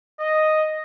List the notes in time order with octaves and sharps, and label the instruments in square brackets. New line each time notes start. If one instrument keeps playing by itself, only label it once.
[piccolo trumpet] D#5